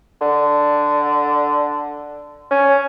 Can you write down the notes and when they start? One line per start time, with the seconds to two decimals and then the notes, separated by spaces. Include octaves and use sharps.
0.21 D3
2.51 C#4